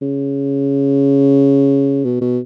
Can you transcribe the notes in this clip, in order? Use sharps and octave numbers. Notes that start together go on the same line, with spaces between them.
C#3
B2
B2